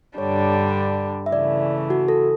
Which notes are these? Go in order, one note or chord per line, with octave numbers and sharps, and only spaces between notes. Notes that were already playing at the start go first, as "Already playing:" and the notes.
G2 D3 G3 D4 C#5
E5
C#3 E3 A3 D5
F#4
A4